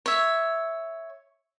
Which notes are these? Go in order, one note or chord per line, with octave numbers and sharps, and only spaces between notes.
C#5 E5